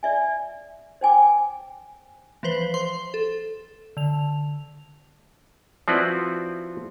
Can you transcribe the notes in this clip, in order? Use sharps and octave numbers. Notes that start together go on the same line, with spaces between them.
D5 E5 G#5
C5 G5 G#5 D6
E3 F3 B4 C5
C5 C6
A4
D3 F7
F3 C4 E4 F#4 B4 D5